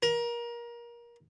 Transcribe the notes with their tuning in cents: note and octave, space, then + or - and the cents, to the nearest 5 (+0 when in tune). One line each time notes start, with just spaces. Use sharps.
A#4 +25